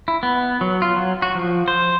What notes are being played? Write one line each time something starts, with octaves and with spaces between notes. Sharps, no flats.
E4
B3
F#3
F4
F#3
F#4
F3
C5